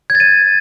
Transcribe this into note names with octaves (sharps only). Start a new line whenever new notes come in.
G#6
A6
D#7